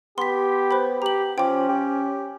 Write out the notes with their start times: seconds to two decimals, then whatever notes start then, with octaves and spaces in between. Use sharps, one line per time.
0.18 B3 G4 C6 B6
0.71 B4 C5 B5
1.02 G4 A#5 F#7
1.38 F3 C#4 G5 D6
1.69 G4